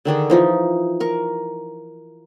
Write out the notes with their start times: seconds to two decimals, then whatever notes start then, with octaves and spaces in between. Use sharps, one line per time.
0.05 D3 D#3 D4 G#4
0.30 E3 F3 D#4
1.00 A#4 C#6